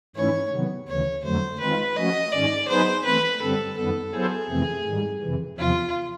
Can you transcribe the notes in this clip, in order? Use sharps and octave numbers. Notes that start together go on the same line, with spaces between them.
G#2 E3 A3 C#4 E4 C#5
C3 D#3 F#3 B3
D2 C#3 E3 C#5
F2 D3 F#3 A3 C5
D#3 G#3 C4 F4 B4
F3 A3 C#4 F#4 D#5
G#2 D#3 G#3 C#4 D5
F#3 B3 D#4 G#4 B4 C5
E3 A3 C4 B4
G2 D3 G3 C4 A4
F#2 D#3 G3 B3 A4
F#3 B3 E4 G#4 A4 C5
F2 C3 E3 A3 C4
G#2 D#3 G3
F2 C3 E3
E2 C3 F3 F4